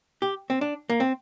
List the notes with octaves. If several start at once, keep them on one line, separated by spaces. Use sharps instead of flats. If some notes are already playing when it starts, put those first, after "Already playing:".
G4
C4
D4
A#3
C4